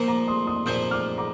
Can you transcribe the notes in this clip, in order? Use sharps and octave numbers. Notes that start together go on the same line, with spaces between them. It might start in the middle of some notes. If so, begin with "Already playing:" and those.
Already playing: A#2 F3 A#3
A#5 D6
C6 D#6
C6 D#6
A#2 F3 A#3 D#6 G6
D6 F6
A#5 D6